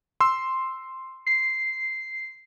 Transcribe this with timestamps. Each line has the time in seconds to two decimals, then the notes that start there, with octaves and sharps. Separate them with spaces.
0.20 C6 E6
1.27 C7